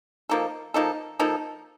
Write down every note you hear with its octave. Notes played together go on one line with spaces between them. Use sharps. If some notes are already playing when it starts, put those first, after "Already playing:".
F3 A#3 D#4 A4
F3 A#3 D#4 A4
F3 A#3 D#4 A4